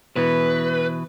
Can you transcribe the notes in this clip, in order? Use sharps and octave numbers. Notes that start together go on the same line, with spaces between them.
B2 E3 B4